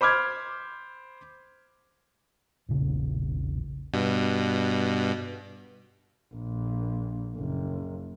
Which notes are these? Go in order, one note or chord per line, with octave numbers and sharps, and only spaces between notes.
C5 B5 D6 F6 G#6
E1 A#1 C#3
G2 B2
A#1
F#1